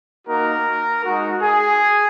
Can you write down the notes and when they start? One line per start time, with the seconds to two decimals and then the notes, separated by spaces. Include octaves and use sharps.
0.27 A#3 D#4 F#4 A#4
1.04 G#3 D#4 F#4
1.43 G#4